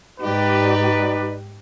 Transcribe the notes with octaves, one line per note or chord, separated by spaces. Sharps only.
G#2 D#4 G4 B4 D5